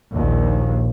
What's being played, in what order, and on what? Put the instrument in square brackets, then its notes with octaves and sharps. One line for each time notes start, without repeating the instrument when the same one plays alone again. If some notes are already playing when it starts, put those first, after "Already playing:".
[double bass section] A#1 D#2